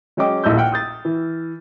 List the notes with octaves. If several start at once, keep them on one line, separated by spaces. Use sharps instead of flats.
F#3 G#3 C#4 D#5 G5 D6
D#1 A#1 A2 D#4 E6 G6
F#5 G5 F6
D#6 G6 A6
E3